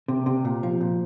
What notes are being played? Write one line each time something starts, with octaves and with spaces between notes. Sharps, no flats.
C3
C3
A#2
F3
A#2